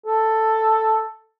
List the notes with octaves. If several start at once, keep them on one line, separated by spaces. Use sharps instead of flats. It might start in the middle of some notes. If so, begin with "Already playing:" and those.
A4